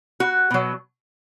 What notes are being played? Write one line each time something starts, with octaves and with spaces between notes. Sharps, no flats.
F#4
B2 F#3